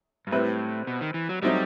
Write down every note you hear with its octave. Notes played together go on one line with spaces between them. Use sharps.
G2
A2 G3 C4 E4 B4
B2
D#3
E3
F#3
F#3 G3 A3 C4 D#4